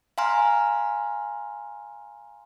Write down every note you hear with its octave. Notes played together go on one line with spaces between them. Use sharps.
F5 G#5 A#5 C6 F6